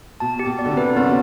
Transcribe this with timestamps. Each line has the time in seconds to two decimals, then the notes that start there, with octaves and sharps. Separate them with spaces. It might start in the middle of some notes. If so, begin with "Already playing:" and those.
0.20 B2 A5
0.39 G4
0.46 B2
0.59 D5
0.65 D3
0.71 C3
0.77 B4
0.96 F#2 B3